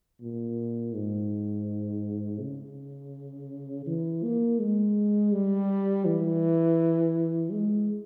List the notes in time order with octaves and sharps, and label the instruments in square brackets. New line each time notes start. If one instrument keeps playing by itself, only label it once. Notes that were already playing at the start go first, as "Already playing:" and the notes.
[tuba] A#2
G#2
C#3
E3
A#3
G#3
G3
E3
G#3